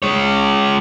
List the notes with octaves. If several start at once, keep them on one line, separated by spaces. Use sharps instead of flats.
G#3 C#5